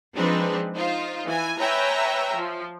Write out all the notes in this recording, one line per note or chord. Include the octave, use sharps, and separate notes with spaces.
F3 G#3 C4 D4 D#4 B4
D#4 F4 C5
E3 G#5
B4 C#5 E5 G5 G#5 A#5
F3